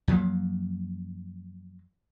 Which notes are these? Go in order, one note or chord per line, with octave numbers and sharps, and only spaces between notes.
F#2 F3 F#3 A#3